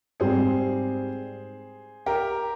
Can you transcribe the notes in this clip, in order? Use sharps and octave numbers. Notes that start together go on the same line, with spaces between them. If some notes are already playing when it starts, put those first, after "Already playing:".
G#2 G3 C4 G#4 C5
G4 A#4